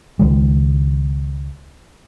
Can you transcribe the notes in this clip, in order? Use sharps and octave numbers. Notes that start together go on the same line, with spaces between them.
C#2 D#3 G#3